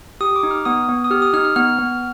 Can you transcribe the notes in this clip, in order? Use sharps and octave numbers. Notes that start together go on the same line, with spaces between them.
G4 D#6
D6
D#4
F6
B3 D#6
B3
D#6
G4 F6
D#6
D#4 F6
F6
B3 F6
B3